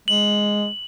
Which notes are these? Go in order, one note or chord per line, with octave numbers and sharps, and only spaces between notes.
G#3 F#7